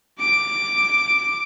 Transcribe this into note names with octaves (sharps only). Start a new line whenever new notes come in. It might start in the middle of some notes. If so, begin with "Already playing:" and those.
D6 D7